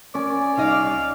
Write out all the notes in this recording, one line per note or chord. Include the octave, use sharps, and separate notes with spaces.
C#4 D5
C2 D#4 D#5 F5